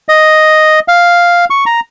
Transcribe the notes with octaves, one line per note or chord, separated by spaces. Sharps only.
D#5
F5
C#6
A#5